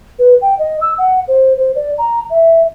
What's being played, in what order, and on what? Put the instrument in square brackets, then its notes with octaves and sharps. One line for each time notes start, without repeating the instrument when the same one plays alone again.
[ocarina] B4
G5
D#5
E6
F#5
C5
C5
D5
A#5
E5